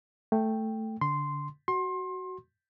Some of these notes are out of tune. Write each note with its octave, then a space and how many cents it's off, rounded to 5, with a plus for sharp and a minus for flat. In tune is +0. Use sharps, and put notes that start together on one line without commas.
A3 +0 G5 +0
D3 -30 C6 -10
F#4 +10 C6 +25